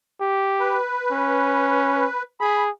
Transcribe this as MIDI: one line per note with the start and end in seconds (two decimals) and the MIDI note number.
0.20 0.78 67
0.60 2.23 71
1.11 2.06 61
2.40 2.70 68
2.40 2.64 83